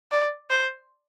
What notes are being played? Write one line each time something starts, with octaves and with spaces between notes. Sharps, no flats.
D5
C5